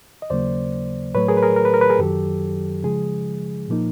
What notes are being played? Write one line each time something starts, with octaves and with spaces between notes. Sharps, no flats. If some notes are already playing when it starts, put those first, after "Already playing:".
D#5
D#2 C#3 F#3 A#3 C5 D5
A2 F#3 A3 B4 C#5
G#4 A#4
B4
G#4 A#4
A#4
B4
A#4
B4
G#4 A#4
F#2 D#3 F#3 G4 A4
C#3 F3 G#3 G#4
A#2 F3 A#3 D#4